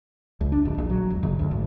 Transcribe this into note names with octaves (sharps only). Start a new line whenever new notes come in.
C#2
D4
D1
A#1
F#3
E1
F#1
D2
G#1